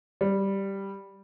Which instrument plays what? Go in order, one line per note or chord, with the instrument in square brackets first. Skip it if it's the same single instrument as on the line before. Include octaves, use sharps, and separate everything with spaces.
[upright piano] G3